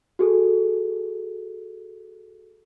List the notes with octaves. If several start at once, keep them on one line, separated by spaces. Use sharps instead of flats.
F#4 G#4 A4